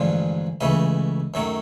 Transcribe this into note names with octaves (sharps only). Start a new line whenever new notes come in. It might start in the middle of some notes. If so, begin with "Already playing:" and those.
Already playing: A1 G2 D3 F3 G#3
C#2 C#3 E3 A3 D#5
F#2 D#3 F#3 A3